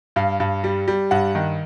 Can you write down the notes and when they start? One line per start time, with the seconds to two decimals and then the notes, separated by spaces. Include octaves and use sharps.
0.16 G2 F5
0.40 G2
0.64 G3
0.88 G3
1.11 G2 F#5
1.35 D#3